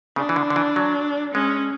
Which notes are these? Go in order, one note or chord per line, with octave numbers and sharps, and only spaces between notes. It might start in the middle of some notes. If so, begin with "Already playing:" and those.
C#3 D4
E3
D3
D3
E3
F#3
G#3 C#4